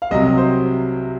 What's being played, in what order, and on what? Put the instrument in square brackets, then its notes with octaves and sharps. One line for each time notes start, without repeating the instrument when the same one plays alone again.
[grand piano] F5
C2 C3 F#3 D#5
C5